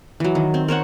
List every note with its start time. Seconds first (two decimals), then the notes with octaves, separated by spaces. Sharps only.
0.20 E3 F#3
0.35 D#3
0.54 C4
0.68 A#4 C5 C#5 F#5